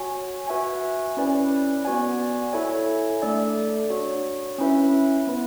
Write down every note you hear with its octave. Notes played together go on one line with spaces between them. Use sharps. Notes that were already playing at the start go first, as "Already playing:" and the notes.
Already playing: F#4 C#5 G#5
F#4 B4 E5 G#5
C#4 E4 B4 D5
B3 F#4 B4 D5 G#5
E4 A4 C#5 E5 G#5
A3 D4 A4 D5
D4 F#4 C#5
C#4 E4 B4 E5
B3 E4 B4